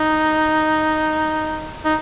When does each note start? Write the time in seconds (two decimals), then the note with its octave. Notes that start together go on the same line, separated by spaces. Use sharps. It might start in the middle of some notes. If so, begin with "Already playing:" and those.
Already playing: D#4
1.85 D#4